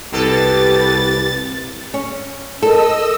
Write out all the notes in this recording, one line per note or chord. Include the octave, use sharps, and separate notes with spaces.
C2 B2 G4 A4 B4 A6
C#4
A4 A#4 D#5 A5 E6